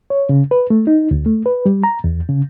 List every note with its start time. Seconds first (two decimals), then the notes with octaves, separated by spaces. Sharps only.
0.10 C#5
0.29 C#3
0.51 B4
0.70 A3
0.87 D#4
1.11 D2
1.26 A3
1.46 B4
1.66 G3
1.84 A#5
2.04 E2
2.29 C#3